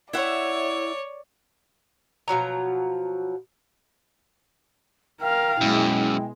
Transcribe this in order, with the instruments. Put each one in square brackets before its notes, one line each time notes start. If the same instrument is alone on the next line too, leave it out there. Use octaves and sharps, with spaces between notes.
[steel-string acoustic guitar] E4 E5 F#5 [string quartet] C#5 [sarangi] D5
[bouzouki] B2 F3 F#3 A#5
[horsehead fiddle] A#4 F5 [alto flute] G5
[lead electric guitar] F#2 [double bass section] B2 G#3 [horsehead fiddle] E4